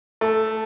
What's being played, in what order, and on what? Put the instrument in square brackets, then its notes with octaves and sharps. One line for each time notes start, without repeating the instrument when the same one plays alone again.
[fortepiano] A3